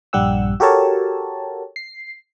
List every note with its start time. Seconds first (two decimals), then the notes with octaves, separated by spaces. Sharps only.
0.13 A#1 G2 G3 G4 F#5 E6
0.60 F#4 G4 A4 A#4 C#5 A5
1.76 C7